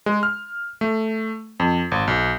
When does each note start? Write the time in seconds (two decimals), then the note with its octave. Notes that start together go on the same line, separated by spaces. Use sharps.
0.06 G#3
0.23 F6
0.81 A3
1.60 F2
1.91 G#1
2.07 B1